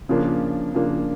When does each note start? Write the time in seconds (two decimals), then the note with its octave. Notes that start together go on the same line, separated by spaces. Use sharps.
0.09 C#3 F3 A#3 D4
0.74 C#3 F3 A#3 D4